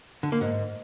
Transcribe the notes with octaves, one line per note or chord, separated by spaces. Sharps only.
D3
A#3
G#2